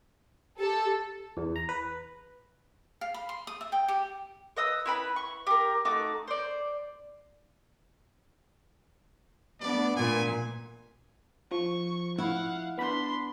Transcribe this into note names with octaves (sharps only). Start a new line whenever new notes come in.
G4 A4
E2
A#5
B4
F5
B5
C6
D#6
E5
G5
G4
B4 D#5 D#6 E6
E4 B4 B5
C#6
G4 A#4
A3 D#4 F#4 D6
C5 D5
A3 B3 D4 D5
A#2 G#5
F3 C#6
E4 F5 F#5
B3 D4 B5 C6